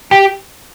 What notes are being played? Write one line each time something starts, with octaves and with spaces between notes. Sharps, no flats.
G4